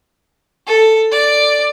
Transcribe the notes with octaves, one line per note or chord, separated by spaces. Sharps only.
A4
D5